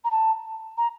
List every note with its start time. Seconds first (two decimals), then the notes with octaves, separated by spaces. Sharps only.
0.04 A#5
0.11 A5
0.77 A#5